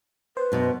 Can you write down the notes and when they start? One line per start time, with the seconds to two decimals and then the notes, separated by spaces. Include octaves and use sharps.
0.37 B4 C5
0.52 F#2 B2